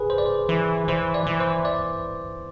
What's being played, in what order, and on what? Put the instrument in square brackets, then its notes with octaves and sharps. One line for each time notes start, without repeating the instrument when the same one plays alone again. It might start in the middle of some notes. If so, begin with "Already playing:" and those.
Already playing: [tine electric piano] G#4 B4
C5
D5
C5
[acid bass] E3
[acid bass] E3 [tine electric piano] C5
[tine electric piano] D5
[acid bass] E3
[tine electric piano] C5
D5